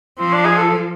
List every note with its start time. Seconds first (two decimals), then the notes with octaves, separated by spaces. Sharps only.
0.19 F3 C4
0.33 D4
0.45 G#4
0.58 A4